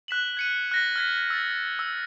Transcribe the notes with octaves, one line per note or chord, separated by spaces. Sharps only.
F#6 B6 E7 F#7
G#6 C#7 D#7
F#6 A#6 B6
F6 G#6 B6
E6 A6
E6